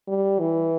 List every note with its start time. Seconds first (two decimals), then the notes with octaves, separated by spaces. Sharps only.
0.08 G3
0.40 E3